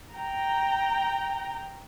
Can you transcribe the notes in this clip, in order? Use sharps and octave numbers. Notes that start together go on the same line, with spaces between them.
G5 A#5